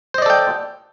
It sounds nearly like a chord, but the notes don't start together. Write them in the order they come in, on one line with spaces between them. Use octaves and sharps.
C5 D#5 D5 A4 G5